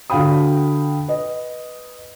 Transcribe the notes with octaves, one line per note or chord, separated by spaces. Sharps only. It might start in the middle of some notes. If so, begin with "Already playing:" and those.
D3 F#4 F5 G5 B5 D#6
B4 D#5